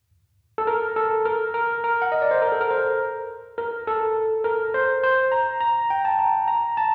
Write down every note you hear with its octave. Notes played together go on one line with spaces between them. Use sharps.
A4
A#4
A4
A#4
A#4
A#4
F#5
D#5
D5
C5
A#4
A4
A#4
C5
A#4
A4
A#4
C5
C5
A#5
A#5
G5
A5
A#5
A#5
A5